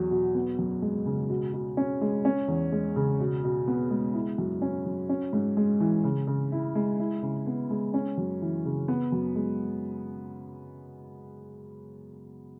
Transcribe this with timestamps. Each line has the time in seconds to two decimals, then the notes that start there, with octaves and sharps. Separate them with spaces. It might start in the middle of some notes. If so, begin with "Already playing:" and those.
Already playing: E2 F#3
0.11 B2
0.35 B3
0.59 F#2
0.82 G#3
1.06 C#3
1.30 B2
1.54 B2
1.77 C#4
2.01 G#3
2.25 C#4
2.48 E2
2.72 G#3
2.96 C#3
3.20 B2
3.44 B2
3.68 B3
3.90 G#3
4.14 E4
4.38 F#2
4.62 C#4
4.86 F#3
5.09 C#4
5.33 G#2
5.57 G#3
5.80 E3
6.04 C#3
6.27 C#3
6.52 E4
6.75 G#3
7.00 E4
7.23 C#3
7.47 B3
7.70 G#3
7.94 C#4
8.18 F#2
8.42 E3
8.65 C#3
8.88 B3
9.12 F#2
9.36 G#3